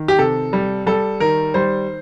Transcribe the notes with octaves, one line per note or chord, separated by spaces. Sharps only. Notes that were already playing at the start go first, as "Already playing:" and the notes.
Already playing: D#3
G4
C3 A4
G3
G3 A4
D#3 A#4
G3 C5